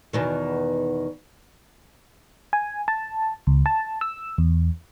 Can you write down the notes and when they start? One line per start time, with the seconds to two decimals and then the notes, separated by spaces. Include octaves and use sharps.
0.13 E2 B2 D#3
2.53 G#5
2.88 A5
3.47 C#2
3.66 A5
4.01 E6
4.38 E2